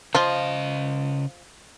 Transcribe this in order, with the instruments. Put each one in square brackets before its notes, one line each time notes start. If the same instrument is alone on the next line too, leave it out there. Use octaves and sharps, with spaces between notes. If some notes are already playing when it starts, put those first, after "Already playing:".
[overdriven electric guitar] C#3 D#5 [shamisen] F3 F4